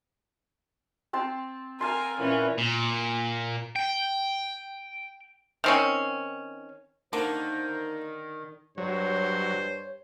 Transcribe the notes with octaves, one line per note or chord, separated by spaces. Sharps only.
C4 A5 C6
A#4 F5 G#5 A5 C6
A#2 E3 C#4
A#2
G5
D#3 C4 C#4
D3 D#3 A#3 C5
G2 F#3 C5 C#5